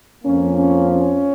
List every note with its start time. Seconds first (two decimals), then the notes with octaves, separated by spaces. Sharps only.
0.24 F2 F3 A#3 C#4
0.58 C#4
0.91 C#4